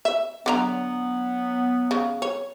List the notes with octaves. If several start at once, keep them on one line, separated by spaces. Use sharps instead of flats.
E5
D3 F#3 B3 F4 A#5
C#3
C#5